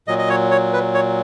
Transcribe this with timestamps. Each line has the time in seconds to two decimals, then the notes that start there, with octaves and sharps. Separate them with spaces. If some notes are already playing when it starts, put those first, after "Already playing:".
0.08 A#2 F#3 D#5
0.19 D#5
0.29 C#5
0.51 C#5
0.73 B4
0.94 C#5